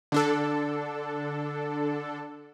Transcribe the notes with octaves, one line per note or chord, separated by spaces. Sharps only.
D3 D4 A4